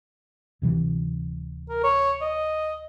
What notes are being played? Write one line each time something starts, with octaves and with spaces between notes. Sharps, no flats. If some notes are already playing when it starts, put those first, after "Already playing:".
D1 C3 E3
A#4
C#5
D#5